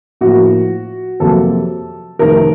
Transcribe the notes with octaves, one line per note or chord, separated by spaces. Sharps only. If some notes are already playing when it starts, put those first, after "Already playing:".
A2 F3 A#3 F#4
F2 C3 F#3 A#3 A4
F2 C3 D#3 A3 A#4